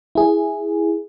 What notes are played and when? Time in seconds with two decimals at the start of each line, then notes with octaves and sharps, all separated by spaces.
0.15 E4 G#4